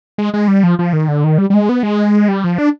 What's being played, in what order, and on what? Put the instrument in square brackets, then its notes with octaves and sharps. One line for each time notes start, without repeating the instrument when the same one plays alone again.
[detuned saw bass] G#3
G#3
G3
F3
F3
D#3
D3
D#3
G3
G3
G#3
B3
G#3
G3
F3
D4